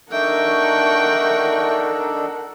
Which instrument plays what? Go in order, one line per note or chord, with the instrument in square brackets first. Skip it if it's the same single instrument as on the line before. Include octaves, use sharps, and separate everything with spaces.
[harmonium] D4 D#4 A4 [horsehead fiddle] A#4 F#5 [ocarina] E5 [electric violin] G5 C#6